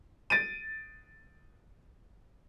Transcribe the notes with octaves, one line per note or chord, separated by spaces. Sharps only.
A6 D7 D#7